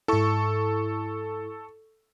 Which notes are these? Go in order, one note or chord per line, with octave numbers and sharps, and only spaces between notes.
G#2 E4 A4 C#6